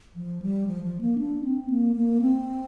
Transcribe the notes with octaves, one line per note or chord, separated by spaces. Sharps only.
F3
G3
F3
F3
A#3
D4
C4
A#3
A#3
C4